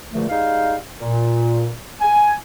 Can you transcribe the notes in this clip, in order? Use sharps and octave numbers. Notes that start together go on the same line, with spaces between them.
E2 A#2 D3 F3 A3
G3 G#3 D#4 F5
A#2
G#5